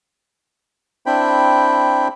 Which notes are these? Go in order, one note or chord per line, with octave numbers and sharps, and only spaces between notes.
C4 D4 E4 G5 B5